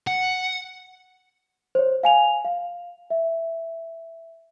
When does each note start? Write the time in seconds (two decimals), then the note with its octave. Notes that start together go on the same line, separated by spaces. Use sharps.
0.07 F#5
1.75 C5 C#5
2.03 F5 G#5 F7
2.45 F5
3.10 E5